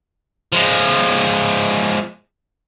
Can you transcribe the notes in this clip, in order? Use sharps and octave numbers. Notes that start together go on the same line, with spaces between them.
F3 G#3